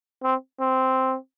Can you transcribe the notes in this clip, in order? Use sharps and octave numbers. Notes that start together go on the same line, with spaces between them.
C4
C4